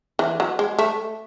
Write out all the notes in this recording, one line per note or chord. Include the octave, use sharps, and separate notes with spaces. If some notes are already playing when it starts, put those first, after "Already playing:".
E3
F#3
G#3
A3